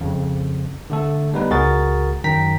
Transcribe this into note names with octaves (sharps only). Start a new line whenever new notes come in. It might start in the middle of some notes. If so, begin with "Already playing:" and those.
F2 C#3
D3 A3 A4
G3 B3 D#4 B4
C#2 F#4 G#4 A#4 A6
F#2 D#3 F#3 G5 A#5 B6